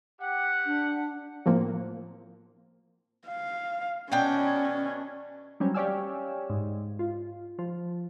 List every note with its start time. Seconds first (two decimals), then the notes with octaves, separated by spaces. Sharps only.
0.20 G4 F#5
0.65 D4
1.46 A2 F3 A#3 C4
3.28 F5
4.12 B2 C#4 D4 G5
5.60 F#3 G3 C4 C#4
5.75 G4 C#5 D5 F5 G#5 E6
6.50 G#2
6.99 F4
7.59 F3